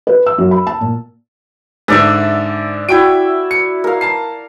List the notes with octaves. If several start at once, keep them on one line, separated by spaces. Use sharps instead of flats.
B4
E6
F#2
B5
A5
A#2
G#2 D3 A4 D5 E5
E4 F#4 G5 D7
C#7
A#4 F5
A5 C7